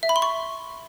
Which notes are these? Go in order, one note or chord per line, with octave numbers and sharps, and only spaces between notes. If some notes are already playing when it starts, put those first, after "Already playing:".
E5
B5
C6
C#6